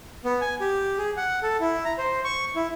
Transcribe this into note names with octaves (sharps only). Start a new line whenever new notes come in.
B3
G#5
G4
G#4
F#5
A4
E4
A#5
C5
C#6
E4